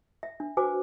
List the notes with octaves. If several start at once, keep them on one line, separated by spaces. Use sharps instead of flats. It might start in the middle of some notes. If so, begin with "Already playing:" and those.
E5
D4
F#4 B4 C5 G#5 D6